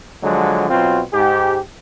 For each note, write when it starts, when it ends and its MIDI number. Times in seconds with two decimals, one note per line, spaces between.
0.24 0.67 50
0.24 0.67 53
0.24 0.67 54
0.24 0.67 56
0.70 1.00 47
0.70 1.00 54
0.70 1.00 60
0.70 1.00 65
1.13 1.59 44
1.13 1.59 67